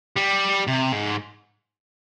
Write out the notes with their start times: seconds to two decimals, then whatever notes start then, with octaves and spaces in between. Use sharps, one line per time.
0.16 G3
0.67 C3
0.93 G#2